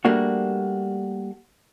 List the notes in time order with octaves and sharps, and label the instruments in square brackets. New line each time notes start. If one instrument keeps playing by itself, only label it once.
[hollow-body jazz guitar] G3 A3 A#3 D4 F#4